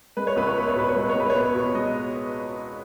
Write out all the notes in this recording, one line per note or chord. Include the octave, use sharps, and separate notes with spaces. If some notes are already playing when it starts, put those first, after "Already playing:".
G#3 B4
C#5
C#2 B4
C#5
B3 B4
C#5
B2 B4
C#5
G#3 B4
C#5
C#2 B4
C#5
B3 B4
B2
G#3 D#5